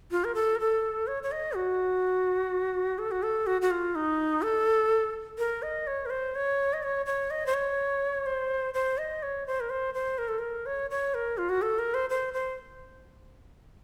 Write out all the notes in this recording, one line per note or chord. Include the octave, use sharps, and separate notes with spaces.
F4
A#4
A4
A#4
A4
C#5
C#5
D#5
F#4
A4
F#4
A4
F#4
F#4
F4
D#4
A4
A#4
D#5
C#5
A#4
C5
C#5
D#5
C#5
C#5
D#5
C5
C#5
C5
C5
D#5
C#5
C5
A#4
C5
C5
A#4
A4
A#4
C#5
C#5
A#4
F4
F#4
A4
A#4
C5
C5
C5